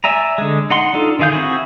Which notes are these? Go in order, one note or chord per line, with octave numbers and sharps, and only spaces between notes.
D5 E5 G#5 A#5
D3 G#3
D#4 F#5 C6
D4 D#4 F4 A4
D3 D#3 G#4 F5 G6
C4 E4 F#4 G#4